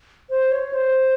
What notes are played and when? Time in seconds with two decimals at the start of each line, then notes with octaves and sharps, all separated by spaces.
0.30 C5
0.51 C#5
0.73 C5